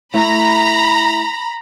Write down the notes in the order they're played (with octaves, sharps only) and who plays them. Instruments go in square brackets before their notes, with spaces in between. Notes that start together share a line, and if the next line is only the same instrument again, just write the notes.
[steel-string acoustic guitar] A3 E4 [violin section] A#5 B5